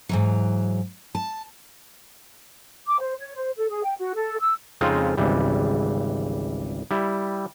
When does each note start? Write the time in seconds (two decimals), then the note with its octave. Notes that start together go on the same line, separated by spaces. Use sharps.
0.09 G#2 E3 F#3
1.15 A5
2.87 D6
3.01 C5
3.19 C#5
3.35 C5
3.58 A4
3.70 G#4
3.84 G5
3.99 F#4
4.14 A4
4.39 E6
4.81 F2 C#3 G#3 C4 D#4 F4
5.17 G#1 C#2 E3 G3
6.91 G3 E4